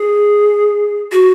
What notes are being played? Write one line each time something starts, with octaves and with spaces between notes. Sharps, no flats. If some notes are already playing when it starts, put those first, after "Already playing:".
Already playing: G#4
F#4